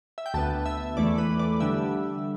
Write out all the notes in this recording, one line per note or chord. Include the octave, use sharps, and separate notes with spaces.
E5
G5
D2 D3 B3 A5
E5
E2 E3 A3 D5
B4
D5
D3 G3 E5